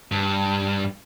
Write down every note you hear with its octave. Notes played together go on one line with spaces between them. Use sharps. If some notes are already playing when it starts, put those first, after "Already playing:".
G2